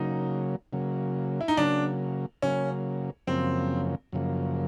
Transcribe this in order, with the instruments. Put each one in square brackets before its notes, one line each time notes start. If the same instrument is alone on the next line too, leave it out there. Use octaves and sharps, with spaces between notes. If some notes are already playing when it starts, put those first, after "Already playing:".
Already playing: [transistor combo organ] C#3 F#3 A#3 [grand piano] D#4
[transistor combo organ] C#3 F#3 A#3
[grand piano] E4
D#4
[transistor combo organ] C#3 F#3 A#3 [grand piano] D4
[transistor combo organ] C#3 F#3 A#3 [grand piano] C#4
[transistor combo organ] F#2 C#3 F3 A#3 [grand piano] C4
[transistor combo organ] F#2 C#3 F3 A#3